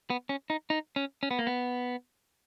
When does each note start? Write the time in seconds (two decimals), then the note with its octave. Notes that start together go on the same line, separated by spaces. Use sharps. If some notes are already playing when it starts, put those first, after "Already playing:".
0.10 B3
0.29 C#4
0.50 D#4
0.70 D#4
0.96 C#4
1.23 C#4
1.31 B3
1.39 A#3
1.47 B3